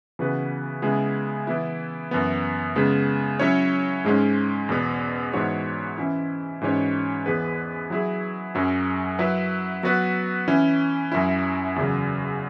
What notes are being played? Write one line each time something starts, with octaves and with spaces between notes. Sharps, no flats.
C#3 E3 B3 F#4 B4
C#3 G#3 B3 E4 G#4
E3 B3 E4
F#2 E3 B3
C#3 G#3 B3
F#3 C#4 E4 C#5
G#2 G#3 C#4
E2 B2 B3
G#2 E3 B3 F#4 C#5
E3 C#4 E4
G#2 E3 C#4 F#4 C#5
E2 E3 B3 G#4 B4
F#3 E4 G#4
F#2 F#3 C#4
F#3 E4 B4
F#3 B3 F#4 B4
E3 C#4 E4
F#2 F#3 C#4 E4
E2 C#3 F#3